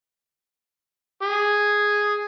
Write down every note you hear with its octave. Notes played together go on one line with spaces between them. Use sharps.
G#4